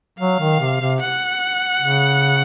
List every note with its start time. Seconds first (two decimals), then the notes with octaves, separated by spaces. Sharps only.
0.19 F#3 F5
0.40 D#3
0.60 C3
0.81 C3
1.00 F#5
1.81 C#3